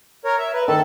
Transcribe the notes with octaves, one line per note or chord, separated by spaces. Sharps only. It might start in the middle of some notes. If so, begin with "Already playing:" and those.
A#4 C#5
E5
B4
D#3 A4 A5